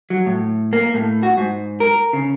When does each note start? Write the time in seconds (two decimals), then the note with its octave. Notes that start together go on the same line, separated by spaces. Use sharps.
0.10 F#3
0.26 A2
0.73 A#3
0.94 A2
1.23 F#4
1.37 G#2
1.80 A#4
2.13 C#3